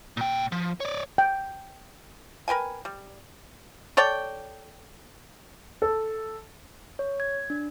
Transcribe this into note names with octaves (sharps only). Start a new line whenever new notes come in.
A#2 G5
F3
C#5 D5
G5
A#4 B4 G5 G#5
G3
A4 C#5 D5 G5
A4
C#5
G#6
D4